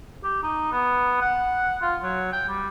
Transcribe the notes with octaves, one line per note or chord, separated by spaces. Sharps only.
G4
D#4
B3
F#5
F4
F#3
G5
G3